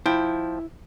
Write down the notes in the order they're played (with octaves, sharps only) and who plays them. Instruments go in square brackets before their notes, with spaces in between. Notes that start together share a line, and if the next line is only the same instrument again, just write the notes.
[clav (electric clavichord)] F3 G5 [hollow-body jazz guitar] E4